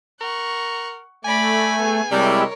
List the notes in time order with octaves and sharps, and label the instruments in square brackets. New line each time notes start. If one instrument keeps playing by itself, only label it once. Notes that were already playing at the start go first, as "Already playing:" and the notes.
[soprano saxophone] A#4 [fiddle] F#5 C#6
[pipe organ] A3 [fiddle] D5 B5 [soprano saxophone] G#5
[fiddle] B3 G#4
[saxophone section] C3 G3 [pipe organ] G#3 E4 G4 [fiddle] A#4 C#5